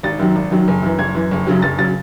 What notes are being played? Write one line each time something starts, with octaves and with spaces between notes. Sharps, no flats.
G#1 A6
F#2 D#3 F#3
G#1
F#2 D#3 F#3
F#1
F#2 E3
F#1 G#6
F#2 E3
F#1
F#2 C#3 F#3
F#1 A6
C#3 F#3 A6